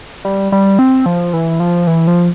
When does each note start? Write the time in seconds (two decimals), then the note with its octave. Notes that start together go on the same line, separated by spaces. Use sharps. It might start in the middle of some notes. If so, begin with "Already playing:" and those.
0.25 G3
0.52 G3
0.79 C4
1.06 F3
1.33 E3
1.60 F3
1.87 E3
2.08 F3